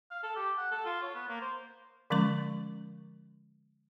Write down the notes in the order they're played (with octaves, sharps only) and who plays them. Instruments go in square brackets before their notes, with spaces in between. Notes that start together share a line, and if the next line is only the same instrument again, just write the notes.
[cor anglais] F5
A4
G4
F#5
A4
F4
C#5
B3
A#3
C5
[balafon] D3 F3 G#3 C#4 A#4 C#6